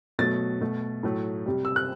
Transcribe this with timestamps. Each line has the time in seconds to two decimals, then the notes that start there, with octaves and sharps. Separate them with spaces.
0.19 B2 F#3 A3 A6
0.61 B2 A3
1.03 A2 F#3 A3
1.46 C3 G3
1.65 E6
1.76 F#6